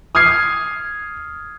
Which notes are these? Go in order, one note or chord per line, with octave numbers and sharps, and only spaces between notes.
D#6 F6 G#6 C7